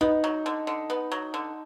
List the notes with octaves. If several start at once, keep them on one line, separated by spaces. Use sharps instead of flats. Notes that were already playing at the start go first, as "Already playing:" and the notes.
B3 D#4
F#3
D3
D3
B3
F#3
D3